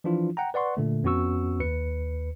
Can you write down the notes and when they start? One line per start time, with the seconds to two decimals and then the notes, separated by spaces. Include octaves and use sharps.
0.04 E3 F3 D4 E4 F4
0.37 F#5 G5 A#5
0.54 B4 D5 F#5 C6 C#6
0.77 A#2 D3 A3
1.04 F2 B3 C#4 F#4 C#6 E6
1.60 D#2 B4 C#7